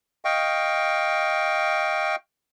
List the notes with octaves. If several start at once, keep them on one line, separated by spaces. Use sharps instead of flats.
D#5 F5 G5 C#6